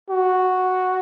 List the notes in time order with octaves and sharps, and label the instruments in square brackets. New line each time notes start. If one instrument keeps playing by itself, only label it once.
[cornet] F#4